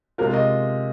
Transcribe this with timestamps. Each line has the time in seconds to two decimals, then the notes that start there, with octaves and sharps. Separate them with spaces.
0.18 C3 G#3 F4 A#4
0.33 D#5